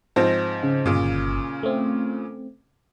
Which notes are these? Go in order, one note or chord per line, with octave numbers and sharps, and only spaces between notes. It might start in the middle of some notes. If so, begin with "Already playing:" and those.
G#2 F3 C4 A#6
C#3
G1 A#2 C#3
A3 C4